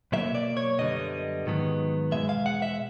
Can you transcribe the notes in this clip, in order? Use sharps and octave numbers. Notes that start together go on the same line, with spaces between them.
B2 F#3 A#3 E5
D5
C#5
F#2 D3 G3 B3 D#5
G#2 D#3 F#3 B3
E2 B2 G#3 E5
F5
F#5
E5